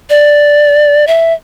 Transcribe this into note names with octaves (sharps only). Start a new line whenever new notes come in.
D5
E5